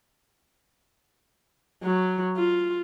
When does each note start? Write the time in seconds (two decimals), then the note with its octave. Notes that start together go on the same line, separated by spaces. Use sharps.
1.83 F#3
2.37 F4